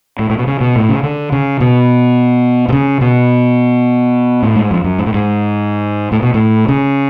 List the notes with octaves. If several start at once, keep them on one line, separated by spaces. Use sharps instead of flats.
A2
A2
B2
C#3
B2
A2
C#3
D3
C#3
B2
B2
C#3
B2
A2
G#2
F2
F#2
G#2
A2
G#2
A2
B2
A2
C#3